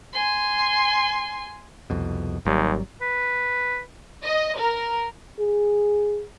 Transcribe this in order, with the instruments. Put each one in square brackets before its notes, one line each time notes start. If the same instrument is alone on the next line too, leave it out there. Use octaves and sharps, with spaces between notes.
[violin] G#5 C6
[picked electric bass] C2 F2 B2
[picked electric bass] G#1 F#3 G3 [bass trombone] D#2
[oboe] B4
[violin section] D#5
A#4
[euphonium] G#4